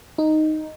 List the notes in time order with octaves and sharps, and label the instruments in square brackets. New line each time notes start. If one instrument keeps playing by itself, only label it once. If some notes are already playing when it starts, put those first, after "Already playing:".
[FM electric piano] D#4